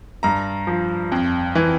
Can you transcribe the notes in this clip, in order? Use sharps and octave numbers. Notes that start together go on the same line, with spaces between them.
G2 A#5
F3
F2
E3